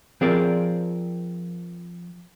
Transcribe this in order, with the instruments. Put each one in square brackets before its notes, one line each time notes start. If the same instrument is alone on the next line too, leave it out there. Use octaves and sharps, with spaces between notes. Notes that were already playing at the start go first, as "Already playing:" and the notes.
[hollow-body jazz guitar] F3 C4 G#4 A#4 D5